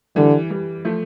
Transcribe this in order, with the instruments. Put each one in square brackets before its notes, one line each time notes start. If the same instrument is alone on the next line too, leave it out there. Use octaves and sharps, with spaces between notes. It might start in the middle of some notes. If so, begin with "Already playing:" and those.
[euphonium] D3 [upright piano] E3 G3
[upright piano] E3 G3
F3 A3